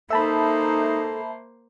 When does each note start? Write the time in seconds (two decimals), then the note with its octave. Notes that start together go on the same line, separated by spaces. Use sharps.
0.10 A#3 D#4 A4 C5 E5 A5 B5